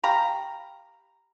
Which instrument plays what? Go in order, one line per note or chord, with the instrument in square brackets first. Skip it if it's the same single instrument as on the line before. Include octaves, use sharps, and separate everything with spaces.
[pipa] G4 F5 A#5 B5